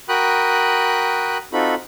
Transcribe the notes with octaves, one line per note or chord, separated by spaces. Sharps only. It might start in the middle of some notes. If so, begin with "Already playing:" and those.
F#4 A#4 G5 B5 D#6 F#6
C4 D#4 F4 F#4 A4 B5